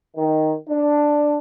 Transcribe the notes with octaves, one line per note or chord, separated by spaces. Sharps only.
D#3
D4